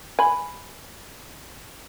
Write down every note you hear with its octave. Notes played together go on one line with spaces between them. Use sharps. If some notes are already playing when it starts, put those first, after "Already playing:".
G#5 B5